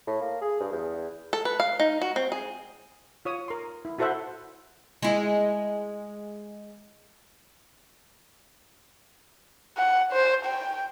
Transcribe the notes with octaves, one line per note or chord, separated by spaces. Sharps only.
A2
A#3
G#4
G2
E2
A4
B4
F5
D#4
F#4
C4
G#4
F4 C#5 D#6
A#4 C6
E4
E4 F#4 A4 C5 E5 F#5
G#3 E4
F#5
C5
G5